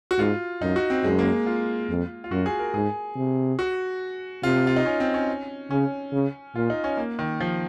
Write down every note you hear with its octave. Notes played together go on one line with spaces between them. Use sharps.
F#4
G#2 F4
F#2 D#4
F#4
C4
F#2 G#3
A#3
F4
F2
F4
F#2 F#4
G#4
A#4
G#2 G#4
C3
F#4
C3 F4
F4
D#4
C#4
C4
C#4
C#3 C#4
C#3
A#2 F4
D#4
C#4
A#3
D#3
F3